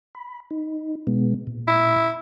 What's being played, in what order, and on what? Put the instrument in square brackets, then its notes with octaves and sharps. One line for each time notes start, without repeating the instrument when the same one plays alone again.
[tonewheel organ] B5
D#4
B2 G#3 B3
A#2
[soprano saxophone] E4